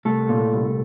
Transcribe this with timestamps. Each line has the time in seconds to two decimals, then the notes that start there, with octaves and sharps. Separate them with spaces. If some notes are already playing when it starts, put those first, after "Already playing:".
0.05 C2 A3 A4
0.29 A#2
0.53 C2